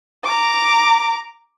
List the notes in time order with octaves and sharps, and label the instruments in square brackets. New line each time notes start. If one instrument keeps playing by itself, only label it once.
[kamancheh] A#5 D6